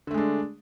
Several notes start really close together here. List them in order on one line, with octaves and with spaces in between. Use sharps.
D3 A3 G#3 D4